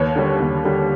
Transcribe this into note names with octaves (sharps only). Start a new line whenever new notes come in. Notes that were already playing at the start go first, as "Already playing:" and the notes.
Already playing: D#2 B4 C#5
D3 G3
D#2
D3 G3